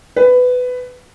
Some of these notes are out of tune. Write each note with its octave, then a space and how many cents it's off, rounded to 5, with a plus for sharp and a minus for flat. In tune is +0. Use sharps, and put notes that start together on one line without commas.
B4 +15